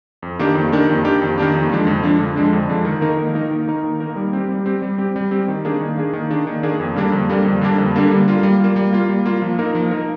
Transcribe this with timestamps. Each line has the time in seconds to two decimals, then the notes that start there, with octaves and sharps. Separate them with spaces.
0.22 F2
0.39 D#3 A#3 D4 G4
0.55 F2
0.72 D#3 A#3 D4 G4
0.89 F2
1.04 D#3 A#3 D4 G4
1.22 F2
1.38 D#3 A#3 D4 G4
1.54 F2
1.70 D3 F3 G#3 D4
1.87 F2
2.03 D3 F3 G#3 D4
2.20 F2
2.36 D3 F3 G#3 D4
2.53 F2
2.69 D3 F3 G#3 D4
2.85 D#3
3.01 A#3 D#4 A#4
3.18 D#3
3.34 A#3 D#4 A#4
3.51 D#3
3.67 A#3 D#4 A#4
3.84 D#3
4.00 A#3 D#4 A#4
4.16 G3
4.33 C4 G4
4.49 G3
4.66 C4 G4
4.82 G3
4.98 C4 G4
5.16 G3
5.31 C4 G4
5.48 D#3
5.65 A#3 D4 G#4
5.81 D#3
5.98 A#3 D4 G#4
6.13 D#3
6.30 A#3 D4 G#4
6.47 D#3
6.63 A#3 D4 G#4
6.80 F2
6.96 D3 G3 A#3 D4
7.12 F2
7.29 D3 G3 A#3 D4
7.44 F2
7.61 D3 G3 A#3 D4
7.78 F2
7.94 D3 G3 A#3 D4
8.11 G3
8.28 A#3 F4
8.43 G3
8.60 A#3 F4
8.76 G3
8.93 A#3 F4
9.09 G3
9.26 A#3 F4
9.42 F3
9.59 A#3 D#4 A#4
9.75 F3
9.91 A#3 D#4 A#4